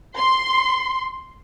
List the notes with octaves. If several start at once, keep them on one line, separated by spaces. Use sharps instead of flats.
C6